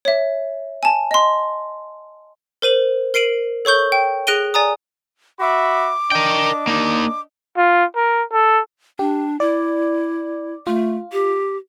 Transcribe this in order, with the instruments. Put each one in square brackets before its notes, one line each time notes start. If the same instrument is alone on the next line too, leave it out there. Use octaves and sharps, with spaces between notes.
[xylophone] C#5 E5
G#5 A5
D#5 C6
A#4 C5 D#7 F#7
A#4 C7 D7 D#7 F#7
A4 C#5 C#6 G6 G7
G5
G#4 F#6 A#6 D7 D#7 G7
D5 G#5 A#5 D#6
[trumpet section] F#4 E5 B5 [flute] D6
[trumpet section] D4 D#5 [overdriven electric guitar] A#4 G5
[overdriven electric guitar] A#3 D#4
[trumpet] F4
A#4
A4
[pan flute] D4 [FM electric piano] G4
[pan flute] E4 [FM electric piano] D5
[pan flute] A3 [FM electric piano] F4
[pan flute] G4